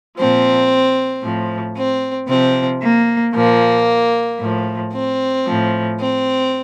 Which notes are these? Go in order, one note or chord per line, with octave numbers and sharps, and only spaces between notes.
A#2 F3 C4
A2 F3
C4
C3 F3 C4
A#3
A#2 F3 A#3
A2 F3
C4
A2 F3
C4